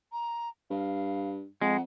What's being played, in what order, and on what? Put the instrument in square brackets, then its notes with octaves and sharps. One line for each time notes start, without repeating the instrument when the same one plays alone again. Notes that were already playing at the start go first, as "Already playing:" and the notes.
[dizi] A#5
[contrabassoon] G2 [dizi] F5
[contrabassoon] F2 [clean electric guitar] G#3 [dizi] F#5